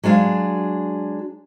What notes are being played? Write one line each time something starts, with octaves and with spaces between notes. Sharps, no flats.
F#3 G#3 D4 F5